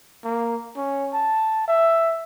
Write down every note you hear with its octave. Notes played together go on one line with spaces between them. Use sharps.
A#3
C#4
A5
E5